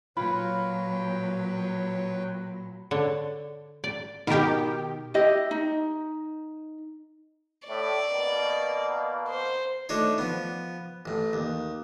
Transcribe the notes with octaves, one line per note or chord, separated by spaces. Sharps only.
A#2 F#3 F4 B4 C#5 G5 B5
D3 C#5
D5
B2 D#3 G4 A#4
E4 G4 D#5
D#4
A2 D5
B2 A#3
C5
A3 D4 D#4 C5 C#5
F3 B3
A1 A2
D#2